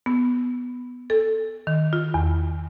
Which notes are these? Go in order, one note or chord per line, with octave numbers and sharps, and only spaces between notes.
B3
A4
D#3
F4
E2